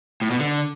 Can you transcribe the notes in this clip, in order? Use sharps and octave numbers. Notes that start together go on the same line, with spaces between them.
A2
B2
D3